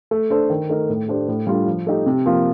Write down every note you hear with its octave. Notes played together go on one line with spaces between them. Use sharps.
A3
D4 A4 C5
D#3
A3 D#4 A#4
A2
A3 D4 G4 C5
A2
G3 D4 F4 A4
F3
A3 D#4 G4
C3
F3 A#3 F4